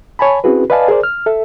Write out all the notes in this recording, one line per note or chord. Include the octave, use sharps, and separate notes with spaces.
C#5 G#5 A5 B5
C4 C#4 E4 F#4 G#4 B4
B4 D5 D#5 F5 G#5 A5
G#4 A#4 C5 D5
F6
A4 E5